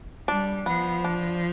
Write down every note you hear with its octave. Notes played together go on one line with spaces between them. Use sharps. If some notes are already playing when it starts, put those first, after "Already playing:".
G3 D4
F3 B3
D4